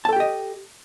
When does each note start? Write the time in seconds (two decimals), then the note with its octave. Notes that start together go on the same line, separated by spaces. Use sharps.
0.05 A5
0.09 A4
0.13 G5
0.16 G4
0.20 D#5